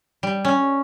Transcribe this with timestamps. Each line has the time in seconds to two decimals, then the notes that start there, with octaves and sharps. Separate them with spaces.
0.23 G3
0.45 C#4